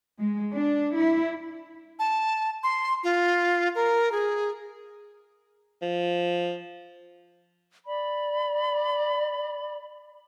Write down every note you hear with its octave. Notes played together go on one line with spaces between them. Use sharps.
G#3
D4
E4
A5
C6
F4
A#4
G#4
F3
D5 B5